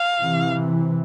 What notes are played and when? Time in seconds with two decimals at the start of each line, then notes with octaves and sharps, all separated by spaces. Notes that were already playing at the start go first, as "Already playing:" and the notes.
Already playing: F5
0.21 C3 E3